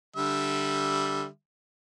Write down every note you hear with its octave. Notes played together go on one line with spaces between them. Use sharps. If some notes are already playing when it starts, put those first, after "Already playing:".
D3 G3 E5